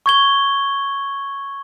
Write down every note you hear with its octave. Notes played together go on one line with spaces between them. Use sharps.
C#6 G#6 G7